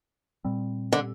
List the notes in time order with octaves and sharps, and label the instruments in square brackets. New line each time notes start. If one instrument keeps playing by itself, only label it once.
[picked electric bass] A#2 G3 C4
[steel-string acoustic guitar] D3